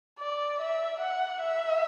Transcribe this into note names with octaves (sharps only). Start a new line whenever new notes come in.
D5
E5
F#5
E5